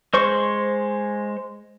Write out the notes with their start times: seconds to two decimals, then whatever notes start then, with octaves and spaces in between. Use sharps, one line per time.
0.14 G#3 C5 C#6